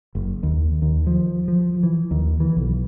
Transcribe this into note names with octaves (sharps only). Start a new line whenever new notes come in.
F#1
D#2
D#2
F3
F3
E3
D#2
E3
B1